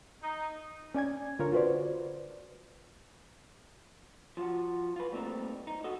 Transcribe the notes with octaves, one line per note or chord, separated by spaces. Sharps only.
D#4
C#4 D5 G#5 G#6
D3 F4 A#4 C#5
F4 F#4 B4 C5 D5
F3 F4 F#4
F4 B4
G3 A3 A#3 C4 D#4
D#4
F#4 A4 D#5